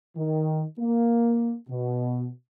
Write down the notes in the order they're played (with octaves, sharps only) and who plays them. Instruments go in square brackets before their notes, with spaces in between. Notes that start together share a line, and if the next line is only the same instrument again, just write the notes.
[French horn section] D#3
A#3
B2